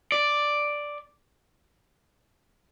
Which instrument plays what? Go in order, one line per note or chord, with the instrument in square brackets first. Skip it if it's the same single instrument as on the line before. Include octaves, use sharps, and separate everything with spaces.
[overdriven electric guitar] D5